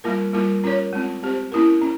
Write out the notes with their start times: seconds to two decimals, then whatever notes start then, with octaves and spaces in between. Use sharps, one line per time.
0.04 G3 A#3 F4 A#4
0.33 G3 A#3 F4 A#4
0.64 C#4 F4 A#4 C#5
0.93 G#3 C4 F4
1.23 C4 G4 C5
1.52 A#3 C#4 E4 A#4
1.82 C#4